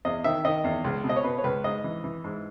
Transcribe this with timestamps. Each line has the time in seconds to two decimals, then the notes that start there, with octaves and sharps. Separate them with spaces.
0.05 E2 D#5
0.24 D#3 E5
0.45 D#3 D#5
0.64 E2
0.84 C#2
1.04 B2
1.09 D#5
1.16 C#5
1.24 B2 B4
1.38 C#5
1.44 C#2 B4
1.64 G#2 D#5
1.84 E3
2.04 E3
2.24 G#2